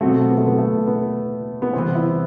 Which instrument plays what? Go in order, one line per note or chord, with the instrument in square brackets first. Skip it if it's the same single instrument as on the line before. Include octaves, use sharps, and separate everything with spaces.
[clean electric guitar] B2 F#3 C4 F#4 [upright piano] A3
[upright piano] B3
A3
B3
A3
B3
B3
[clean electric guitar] C2 C3 E3 B3 [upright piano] C4
[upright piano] E4